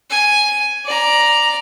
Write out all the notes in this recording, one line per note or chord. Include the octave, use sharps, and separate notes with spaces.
G#5
D5 A#5